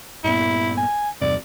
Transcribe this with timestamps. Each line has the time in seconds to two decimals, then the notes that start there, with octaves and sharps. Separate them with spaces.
0.24 G2 A#2 B3 E4
0.77 G#5
1.21 E2 G2 C3 D5